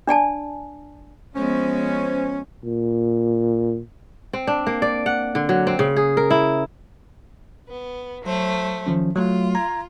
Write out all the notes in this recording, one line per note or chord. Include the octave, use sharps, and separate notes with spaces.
D4 D5 G#5 A5
F3 G#3 B3 C#4 C5
A#2
C4
D4
A#3
D5
F#5
D3
F#3
C4
C#3
G#4
A#4
E4
B3
F#3 A3 C5
D#3 F3 C#4
F#3 A3 F4
A#5 G#6